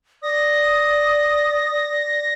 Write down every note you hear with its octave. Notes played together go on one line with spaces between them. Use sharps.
D5 D#6 A#6